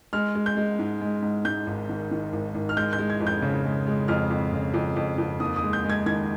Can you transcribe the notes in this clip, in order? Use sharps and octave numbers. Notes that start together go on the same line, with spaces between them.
G#3 F6
G#3
G6
G#3
G#2
G#3
G#2
G#2 G6
G#1
D#3
D#3
G#1
G#1
F6
G#3 G6
G6
G#3
G#6
F2
G6
C#3
G#3
G#3
F2 F6
F2
C#3
F2
F2
F2
D#2 D#6
D#6
G#3
G6
G#3
G#6
D#3 G#6